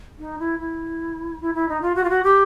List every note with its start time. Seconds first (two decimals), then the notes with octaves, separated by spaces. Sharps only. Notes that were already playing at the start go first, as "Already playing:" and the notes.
0.19 D#4
0.39 E4
0.59 E4
1.41 E4
1.54 E4
1.69 D#4
1.82 F4
1.95 F#4
2.04 F4
2.10 F#4
2.24 G4